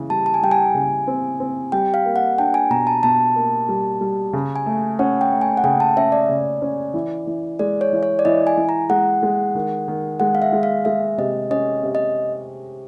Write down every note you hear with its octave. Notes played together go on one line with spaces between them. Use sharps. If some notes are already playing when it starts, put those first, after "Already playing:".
Already playing: C#3 E3
G3 A5
A5
G#5
G3 G5
G#5
C#3
C4
C4
G3 G5
F5
A#3
F#5
D4 G5
G#5
B2 A#5
A5
B2 A5
A#3
G3
G3
C#3
G#5
A3
C#4 F#5
G5
A3
G#5
F#5
C#3 G5
A5
C#4 E5
D5
C#3
C#4
E3
E3
G#3 D5
C#5
E3
C#5
D5
E3 D#5
G#5
E3
A#5
G#3 F#5
G#3
D#3
D#3
G#3 F#5
F5
E5
G#3
F5
G#3 E5
C3 D#5
C#4 D#5
C3
D#5